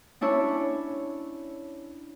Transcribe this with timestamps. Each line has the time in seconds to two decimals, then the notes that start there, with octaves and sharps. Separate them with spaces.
0.21 C#4 D4 E4 C#5